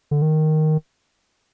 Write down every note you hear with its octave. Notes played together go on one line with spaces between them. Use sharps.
D3
D#3